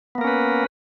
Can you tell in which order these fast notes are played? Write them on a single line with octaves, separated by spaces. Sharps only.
B3 A#3 A#4 C#4 B4